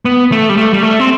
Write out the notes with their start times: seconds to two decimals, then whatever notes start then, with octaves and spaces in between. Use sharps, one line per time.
0.05 B3
0.32 A3
0.49 G3
0.57 A3
0.73 G3
0.83 A3
1.00 C4